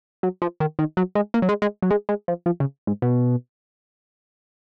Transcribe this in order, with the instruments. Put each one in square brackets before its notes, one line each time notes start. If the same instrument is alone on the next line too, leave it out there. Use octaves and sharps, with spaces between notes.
[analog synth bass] F#3
F3
D#3
D#3
F#3
G#3
A#3
F#3
G#3
G#3
F#3
G#3
G#3
F3
F3
C#3
G#2
B2